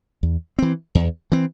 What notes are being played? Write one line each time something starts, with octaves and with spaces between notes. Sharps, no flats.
E2
E3 C4
E2
E3 C4